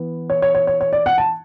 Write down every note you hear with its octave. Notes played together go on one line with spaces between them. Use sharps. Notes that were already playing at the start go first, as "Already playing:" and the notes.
Already playing: E3 B3
C#5
C#5
C#5
C#5
C#5
D5
F#5
A5